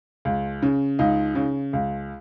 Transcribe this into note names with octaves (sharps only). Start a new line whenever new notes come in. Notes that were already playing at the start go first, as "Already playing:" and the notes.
C#2
C#3
C#2 D#4
C#3
C#2